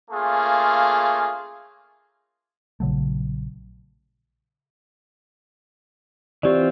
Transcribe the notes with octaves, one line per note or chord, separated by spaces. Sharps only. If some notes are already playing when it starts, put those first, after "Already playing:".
A3 A#3 C#4 F4 G#4
A#1 C#3 F#3 A3
E3 C4 F4 G4 D5